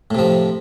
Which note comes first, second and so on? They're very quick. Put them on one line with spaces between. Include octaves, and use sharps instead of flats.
A2 C3 F3